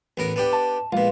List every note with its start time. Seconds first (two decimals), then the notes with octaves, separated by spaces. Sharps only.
0.17 A1 B3 A#4
0.36 B3 D4 G4
0.53 A5
0.92 A#1 B2 G#3 F4 F5